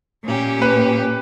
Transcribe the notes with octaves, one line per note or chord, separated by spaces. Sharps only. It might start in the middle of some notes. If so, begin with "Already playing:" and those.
A#2 A#3 C#4 G4
B4